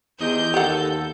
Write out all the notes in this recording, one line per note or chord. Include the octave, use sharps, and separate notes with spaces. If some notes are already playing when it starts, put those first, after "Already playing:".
E2 G#2 G4 D#5 G6
D#2 G4 A4 F#5